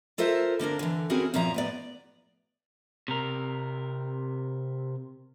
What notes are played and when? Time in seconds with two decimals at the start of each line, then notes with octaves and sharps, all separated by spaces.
0.18 F4 A4 A#4 C5 E5
0.59 D3 A#3 D4 A#4
0.79 D3 E3
1.10 C4 C#4 E4 F#4 G#4 A#4
1.34 F#2 A#2 F3 E5 A#5
1.54 A2 B3 D5
3.08 C3 A#4